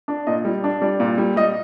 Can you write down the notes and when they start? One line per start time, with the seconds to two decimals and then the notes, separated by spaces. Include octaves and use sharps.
0.08 D4
0.27 A#2 D#5
0.45 G3
0.64 D4
0.82 G3 D5
1.00 A#2
1.18 G3
1.36 G3 D#5